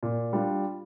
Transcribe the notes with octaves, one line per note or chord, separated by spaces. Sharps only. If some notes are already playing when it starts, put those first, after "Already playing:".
A#2
G3 D4 F4